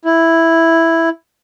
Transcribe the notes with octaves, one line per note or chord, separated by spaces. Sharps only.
E4